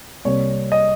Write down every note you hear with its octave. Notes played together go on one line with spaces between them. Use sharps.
C2 C3 G3 A#3 C#5
D#5